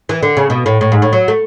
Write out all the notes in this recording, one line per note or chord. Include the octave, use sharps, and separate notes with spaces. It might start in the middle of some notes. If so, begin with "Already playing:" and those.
E3
D3
C#3
B2
A2
A2
G#2
A2
F#3
A3